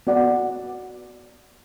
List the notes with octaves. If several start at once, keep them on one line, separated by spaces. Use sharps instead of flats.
B3 F#4 D5 F#5